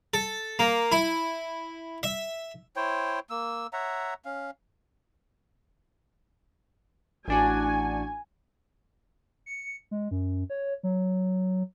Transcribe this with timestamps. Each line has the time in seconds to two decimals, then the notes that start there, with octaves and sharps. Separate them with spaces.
0.14 A4
0.59 A#3
0.92 E4
2.03 E5
2.76 E4 C5 C#5 G5
3.30 A#3 E6
3.73 C#5 E5 F#5 A#5
4.25 C#4 F5
7.28 A1 D4 F#4 G#5
9.46 C#7
9.91 G#3
10.11 F#2
10.50 C#5
10.83 F#3